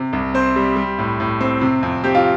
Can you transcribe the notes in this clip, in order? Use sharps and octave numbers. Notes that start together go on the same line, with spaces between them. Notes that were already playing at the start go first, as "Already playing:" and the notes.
Already playing: C3
C2
C4 C5
G3
G3
A2
A2
C4
C3
F2
C4 G4
F4